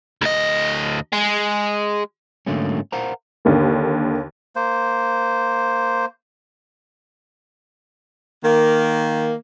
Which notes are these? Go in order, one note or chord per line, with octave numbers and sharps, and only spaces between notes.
D2 D#5
G#3
G#2 D3 F#3 A3 A#3 C#4
A#4 C5 F5 F#5 A#5
D#2 D3 A#3
A#3 C5
D#3 A#3